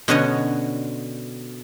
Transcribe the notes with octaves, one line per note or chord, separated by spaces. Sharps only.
B2 D3 B3 C#4 C#5 D#5